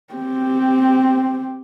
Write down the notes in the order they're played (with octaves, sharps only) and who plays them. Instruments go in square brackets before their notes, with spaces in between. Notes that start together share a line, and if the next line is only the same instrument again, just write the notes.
[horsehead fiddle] C4 G4